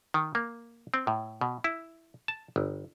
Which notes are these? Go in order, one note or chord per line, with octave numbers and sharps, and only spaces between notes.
D#3
A#3
C4
A2
B2
E4
A5
G1